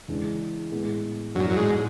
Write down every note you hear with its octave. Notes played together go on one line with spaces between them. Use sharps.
E2 C#3 G#3 D4
A2 G#3 B3
F#2 A2 F#3 B3 D4
F#2
G#2